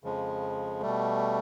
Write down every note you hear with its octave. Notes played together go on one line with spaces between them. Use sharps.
F2 C#3 F3 G#3
B2 G3 A3